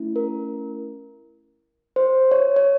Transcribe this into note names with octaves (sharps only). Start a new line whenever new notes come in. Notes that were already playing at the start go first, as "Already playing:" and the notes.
Already playing: A3 C#4 E4
A#4
C5
C#5
C#5